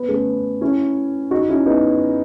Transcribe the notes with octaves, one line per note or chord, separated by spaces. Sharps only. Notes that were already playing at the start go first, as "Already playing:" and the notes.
Already playing: B3
A3 C#4
C#4 E4
D#4 F#4
C#4 E4
B3 D#4